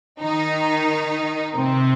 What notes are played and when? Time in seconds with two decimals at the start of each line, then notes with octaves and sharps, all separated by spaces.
0.21 D#3 D#4
1.55 C3 C4